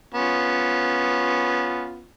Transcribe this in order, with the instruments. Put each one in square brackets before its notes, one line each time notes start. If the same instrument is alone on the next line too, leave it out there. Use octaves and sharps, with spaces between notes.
[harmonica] B3 C#4 F4